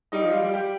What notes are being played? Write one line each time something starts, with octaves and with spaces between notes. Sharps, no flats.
G3 D#4 D#5
F3
G3 F4 F5
G3
G4 G5